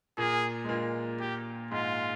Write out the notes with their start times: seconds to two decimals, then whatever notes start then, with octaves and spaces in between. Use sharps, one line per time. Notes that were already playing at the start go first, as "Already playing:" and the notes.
0.18 A#2 A#3 G#4
0.64 G#3
0.69 A#2 A#3
1.20 G4
1.71 G#2 G#3 F4